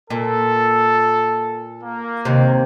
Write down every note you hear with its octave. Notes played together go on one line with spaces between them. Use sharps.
A#2 A4
A#3
D#2 C3